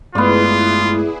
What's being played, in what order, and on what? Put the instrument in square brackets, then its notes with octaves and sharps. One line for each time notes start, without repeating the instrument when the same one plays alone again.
[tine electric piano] G2 G#3 A3 [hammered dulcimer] B3 D5 [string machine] E4 G#4 [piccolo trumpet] F4